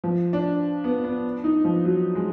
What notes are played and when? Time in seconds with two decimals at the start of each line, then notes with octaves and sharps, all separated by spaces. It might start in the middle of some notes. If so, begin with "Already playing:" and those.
0.04 F3
0.33 D4
0.84 B3
1.04 B3
1.44 D#4
1.65 F3
1.85 F#3
2.15 G#3